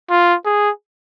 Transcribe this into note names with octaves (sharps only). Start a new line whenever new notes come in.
F4
G#4